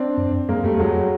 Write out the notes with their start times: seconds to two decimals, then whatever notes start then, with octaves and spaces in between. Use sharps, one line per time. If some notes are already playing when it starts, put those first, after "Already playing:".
Already playing: C4 D4
0.17 F#2
0.49 F#2 G#3 A#3
0.64 F2 G3 A3
0.74 A3
0.79 E2 F#3 G#3